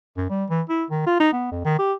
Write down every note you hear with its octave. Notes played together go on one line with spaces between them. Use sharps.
F#2
G3
E3
E4
D#3
F4
D#4
B3
F2
D#3
G4